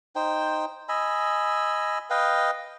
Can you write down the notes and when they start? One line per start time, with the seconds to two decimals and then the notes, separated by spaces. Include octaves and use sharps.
0.16 D#4 C5 G5
0.89 D#5 G#5 B5 E6
2.10 B4 D#5 F5 G5